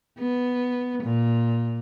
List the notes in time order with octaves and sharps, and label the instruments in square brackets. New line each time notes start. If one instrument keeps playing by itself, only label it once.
[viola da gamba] B3
A#2